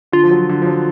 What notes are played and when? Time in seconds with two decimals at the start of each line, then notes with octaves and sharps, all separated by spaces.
0.12 D3 F4
0.24 F3
0.31 F#3
0.49 D3
0.62 F3
0.66 F#3